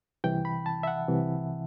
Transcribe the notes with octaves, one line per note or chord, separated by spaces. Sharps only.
C2 C3 E3 G5
B5
A5
E5
F#5
C2 C3 E3